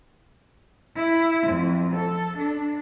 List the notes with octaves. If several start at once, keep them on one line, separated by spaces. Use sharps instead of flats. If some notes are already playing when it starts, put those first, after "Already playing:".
E4
F2
A4
D4